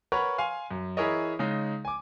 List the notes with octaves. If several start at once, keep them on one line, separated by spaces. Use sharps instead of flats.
A#4 B4 C#5 F#5 C#6
F5 G#5 C6
F#2
E3 E4 G#4 A#4 C#5 D#5
C#3 G#3 D#4
G#5 D6